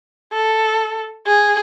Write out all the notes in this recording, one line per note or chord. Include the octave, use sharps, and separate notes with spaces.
A4
G#4